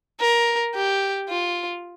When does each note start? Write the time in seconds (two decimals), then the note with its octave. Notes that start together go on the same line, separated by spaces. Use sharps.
0.21 A#4
0.75 G4
1.29 F4